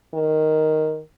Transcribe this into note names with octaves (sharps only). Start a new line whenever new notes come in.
D#3